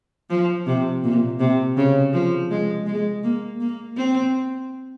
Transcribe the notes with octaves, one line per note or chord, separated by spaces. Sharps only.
F3
C3
A#2
C3
C#3
F3
G#3
G#3
A#3
A#3
C4